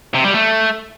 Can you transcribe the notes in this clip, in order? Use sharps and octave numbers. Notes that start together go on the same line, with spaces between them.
C3
G3
A3